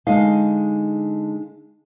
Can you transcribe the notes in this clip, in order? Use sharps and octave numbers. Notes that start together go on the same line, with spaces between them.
D3 G#3 D#4 F5